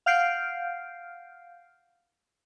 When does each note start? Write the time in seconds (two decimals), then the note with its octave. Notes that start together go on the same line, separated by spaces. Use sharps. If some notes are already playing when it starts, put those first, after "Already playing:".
0.06 F5 F#5 F6 G6 C7 D7